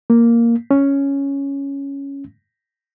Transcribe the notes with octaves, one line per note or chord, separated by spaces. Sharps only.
A#3
C#4